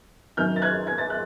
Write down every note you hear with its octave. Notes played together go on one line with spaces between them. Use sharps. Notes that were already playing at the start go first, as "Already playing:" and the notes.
F#2 D#3 F6 G6
A6
F#6 G#6
G#6
A6
F#6